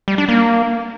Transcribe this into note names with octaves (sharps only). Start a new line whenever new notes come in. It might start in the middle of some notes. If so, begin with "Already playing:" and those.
G3
D4
A#3